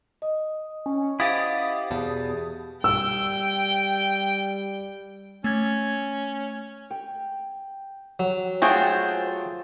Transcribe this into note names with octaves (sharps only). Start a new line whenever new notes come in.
D#5 D#6
C#4
E4 G4 C5 D#5 F5 F#5 D#6 A6
E2 B2 G4 G#4 A5
G3 G5 E6
A3 C#4 G#6
G5
F#3
A3 F4 F#4 G#4 C5 G5 A5